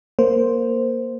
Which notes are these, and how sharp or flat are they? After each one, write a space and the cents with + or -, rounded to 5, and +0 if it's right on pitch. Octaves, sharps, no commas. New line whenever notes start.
A#3 +0 C5 +0